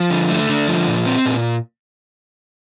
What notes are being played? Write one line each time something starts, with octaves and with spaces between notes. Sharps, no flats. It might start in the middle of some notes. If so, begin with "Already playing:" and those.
Already playing: F3
D3
A3
D3
F3
A#2
C4
A#2